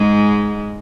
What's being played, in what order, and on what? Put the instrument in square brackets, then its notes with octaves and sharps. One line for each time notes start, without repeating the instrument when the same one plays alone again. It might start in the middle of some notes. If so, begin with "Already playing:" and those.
Already playing: [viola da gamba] G#2 G#3